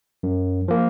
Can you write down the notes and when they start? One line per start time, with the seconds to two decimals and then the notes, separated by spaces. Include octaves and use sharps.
0.23 F#2
0.68 F3 A#3